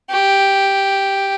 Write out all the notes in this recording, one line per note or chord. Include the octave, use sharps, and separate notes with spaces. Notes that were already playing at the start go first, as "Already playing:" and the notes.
G4